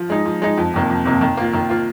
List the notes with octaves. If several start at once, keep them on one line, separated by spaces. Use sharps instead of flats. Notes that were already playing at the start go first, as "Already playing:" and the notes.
Already playing: F3
G#3 D#4
F3
G#3 D#4
F2
C3 D#3 A#3
F2
C3 D#3 A#3
D#3
A#3 F4
D#3
A#3 F4